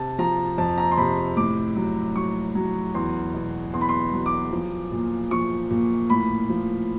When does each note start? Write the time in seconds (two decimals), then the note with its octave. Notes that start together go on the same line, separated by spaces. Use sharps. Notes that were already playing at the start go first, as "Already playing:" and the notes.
Already playing: C3 A5
0.19 F3 A#5
0.58 F2 A5
0.78 A#5
0.91 C6
0.97 C3 B5
1.37 A2 D6
1.76 F#3
2.15 F#3 C#6
2.55 F#3
2.94 E2 C6
3.34 B2
3.73 E2 C6
3.81 B5
3.89 C6
4.13 F#3
4.26 D6
4.52 F3
4.92 A#2
5.31 F3 C#6
5.70 A#2
6.10 A2 B5
6.49 F3